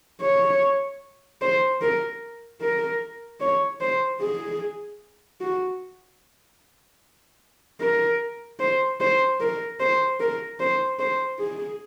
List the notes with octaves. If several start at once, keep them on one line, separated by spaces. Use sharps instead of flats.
C#5
C5
A#4
A#4
C#5
C5
G#4
F#4
A#4
C5
C5
A#4
C5
A#4
C5
C5
G#4